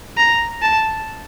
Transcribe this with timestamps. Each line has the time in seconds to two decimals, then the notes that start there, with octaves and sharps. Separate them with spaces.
0.17 A#5
0.62 A5